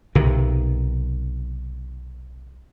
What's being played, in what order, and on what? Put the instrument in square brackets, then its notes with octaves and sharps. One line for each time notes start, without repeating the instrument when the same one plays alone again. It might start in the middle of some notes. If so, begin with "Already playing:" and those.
[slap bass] B1 C3 D#3